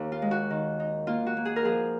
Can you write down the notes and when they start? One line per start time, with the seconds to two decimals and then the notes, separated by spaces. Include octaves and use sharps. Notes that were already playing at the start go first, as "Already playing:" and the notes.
Already playing: D#2
0.12 F4
0.22 G#3
0.31 F#4
0.50 D#3
0.80 D#4
1.07 A#3 F4
1.26 F#4
1.37 A#3
1.45 G#4
1.56 A#4
1.65 F3 G#4